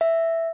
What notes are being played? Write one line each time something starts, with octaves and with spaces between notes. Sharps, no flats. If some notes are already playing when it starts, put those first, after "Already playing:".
E5